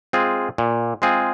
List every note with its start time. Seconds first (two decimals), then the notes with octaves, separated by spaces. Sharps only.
0.13 G#3 C4 F4 G#4
0.58 A#2
1.02 G#3 C4 F4 G#4